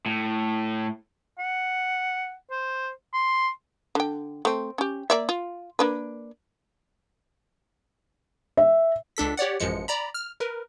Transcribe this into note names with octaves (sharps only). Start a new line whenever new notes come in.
A2
F#5
C5
C6
D3 G5
A3 C4
C#4 G4
A#3 D5 E5
F4
A#3 D4 B4
E5
C#2 D4 A4 B6
G4 C#5 D5 F#5
A1 F#2 F3 G#3 C#7
D5 A#5 B5
F6
A#4 B4